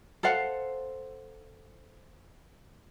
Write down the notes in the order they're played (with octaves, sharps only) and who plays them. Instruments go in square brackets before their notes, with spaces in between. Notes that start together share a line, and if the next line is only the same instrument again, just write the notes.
[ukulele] A4 C5 F5 F#5